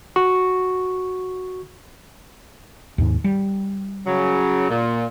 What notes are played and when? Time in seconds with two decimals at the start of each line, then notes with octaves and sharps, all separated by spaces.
0.16 F#4 C#6
2.98 D#2 G#2
3.24 G3
4.07 C#3 F#3
4.70 A#2